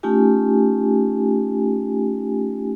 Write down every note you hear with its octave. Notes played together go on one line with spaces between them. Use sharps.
A3 C#4 D#4 F4 G4 G#5